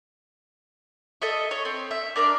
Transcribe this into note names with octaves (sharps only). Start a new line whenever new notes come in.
A4 D#5 E5
C#5
C4
E5
D4 A#4 B4 D5